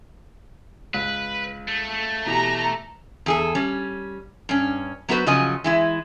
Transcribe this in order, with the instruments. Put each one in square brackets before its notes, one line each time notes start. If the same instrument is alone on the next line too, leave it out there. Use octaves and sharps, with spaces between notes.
[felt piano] C#2 [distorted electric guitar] B4
[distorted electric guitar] A3
[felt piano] B2 E3 G4 [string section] A#5
[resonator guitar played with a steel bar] E2 G#4 A4
G3 C#4
G2 C#4
F#3 B3 F#4 B4 C5
C#3 F3 F#3 D#5 G#5
E3 G#3 E4